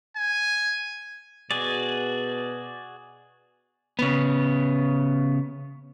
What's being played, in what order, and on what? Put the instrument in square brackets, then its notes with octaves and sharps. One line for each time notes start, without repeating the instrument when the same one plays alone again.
[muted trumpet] G#5
[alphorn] B2 [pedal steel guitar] F#4 G#4 D5
[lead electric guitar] C#3 B3